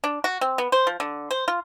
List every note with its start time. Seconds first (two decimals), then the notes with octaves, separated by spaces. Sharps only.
0.04 D4
0.24 F#4
0.41 C4
0.58 B3
0.72 C5
0.87 F3
1.00 D3
1.31 C5
1.48 F4